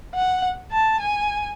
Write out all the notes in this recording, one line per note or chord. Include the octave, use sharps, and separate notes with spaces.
F#5
A5
G#5